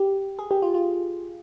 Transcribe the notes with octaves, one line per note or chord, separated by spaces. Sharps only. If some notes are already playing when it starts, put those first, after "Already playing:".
Already playing: G4
G#4
G4
F4
F4